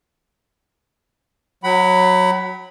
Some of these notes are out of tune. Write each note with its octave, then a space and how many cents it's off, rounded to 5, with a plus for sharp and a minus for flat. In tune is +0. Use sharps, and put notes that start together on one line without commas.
F#3 -10 F#5 +35 B5 +0